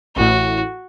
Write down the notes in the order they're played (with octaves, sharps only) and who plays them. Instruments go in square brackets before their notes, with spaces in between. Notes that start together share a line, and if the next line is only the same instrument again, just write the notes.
[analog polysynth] A1 A2 [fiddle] F#4